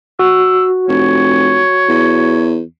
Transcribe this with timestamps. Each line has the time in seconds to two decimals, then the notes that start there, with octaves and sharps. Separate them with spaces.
0.19 F#4 E6
0.88 F1 C#5
1.89 E2